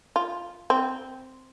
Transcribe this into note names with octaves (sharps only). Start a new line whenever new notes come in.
F4
C4